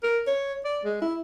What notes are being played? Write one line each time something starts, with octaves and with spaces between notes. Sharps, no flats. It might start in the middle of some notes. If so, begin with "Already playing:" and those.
A#4
C#5
D5
G#3
E4